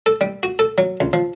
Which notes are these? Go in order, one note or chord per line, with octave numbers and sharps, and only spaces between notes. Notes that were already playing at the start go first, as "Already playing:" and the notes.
A4
G3
F#4
A4
F#3
C#2
F3